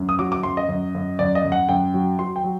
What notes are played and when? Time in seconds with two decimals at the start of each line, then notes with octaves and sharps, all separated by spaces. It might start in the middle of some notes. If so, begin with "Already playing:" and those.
Already playing: F#2
0.09 D#6
0.19 F#3 D6
0.32 D6
0.43 F#2 C6
0.57 D#5
0.68 F#2
0.95 F#2
1.19 F#2 D5
1.35 D#5
1.44 F#2
1.52 F#5
1.69 F#2 G5
1.94 F#3
2.19 F#3 C6
2.36 G5
2.44 F#3